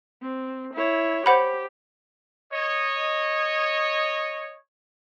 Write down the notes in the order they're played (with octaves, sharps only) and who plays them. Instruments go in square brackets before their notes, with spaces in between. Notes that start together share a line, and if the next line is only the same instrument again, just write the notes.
[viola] C4
E4 C#5
[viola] G4 [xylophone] C5 F#5 B5
[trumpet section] C#5 D#5